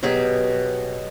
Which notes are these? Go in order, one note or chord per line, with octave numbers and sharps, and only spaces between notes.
B2 F#3 G4 G#4